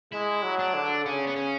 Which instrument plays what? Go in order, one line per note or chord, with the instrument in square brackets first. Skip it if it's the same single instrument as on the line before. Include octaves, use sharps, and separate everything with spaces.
[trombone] G#3 [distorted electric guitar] E4
[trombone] F#3
[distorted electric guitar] D4
[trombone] D3
[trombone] C#3 [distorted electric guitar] C#4
[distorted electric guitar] B3
C#4